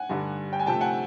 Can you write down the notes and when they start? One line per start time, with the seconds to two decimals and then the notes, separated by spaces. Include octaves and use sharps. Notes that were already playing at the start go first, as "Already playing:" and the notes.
Already playing: F#5 G#5
0.09 G2 D3 G3
0.53 G5
0.59 G#5
0.66 C3 F3 A3 G5 A5
0.81 F#5 G#5